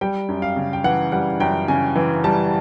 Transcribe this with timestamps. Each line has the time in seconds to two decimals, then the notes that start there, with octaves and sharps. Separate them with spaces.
0.01 G3 G5
0.29 F#2
0.42 F5
0.56 C#3
0.73 G5
0.84 E3 F#5
1.12 G3 F#5
1.40 F#2 G5
1.68 C#3 G#5
1.96 E3
2.24 G3 A5